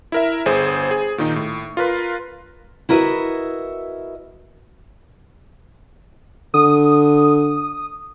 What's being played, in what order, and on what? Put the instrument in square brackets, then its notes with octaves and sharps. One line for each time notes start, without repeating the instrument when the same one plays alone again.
[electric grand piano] E4 A#4 E5
G1 G#4 C5
G#4
A#2 D#3 D#4
A2
F4 A#4 B4 C6
[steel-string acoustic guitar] E4 F#4 A#4 B4 D#5 E5
[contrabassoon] D3 [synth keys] D#6